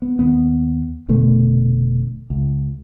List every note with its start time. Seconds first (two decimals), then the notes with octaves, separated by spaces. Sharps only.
0.02 B3
0.19 D#2 B3
1.08 F1 B2 D3 A3
2.30 C#2